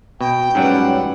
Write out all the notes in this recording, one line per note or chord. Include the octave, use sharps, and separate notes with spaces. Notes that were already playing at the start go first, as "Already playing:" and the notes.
B2 G5
G#2 F#3 G3 C#4 B4 F#5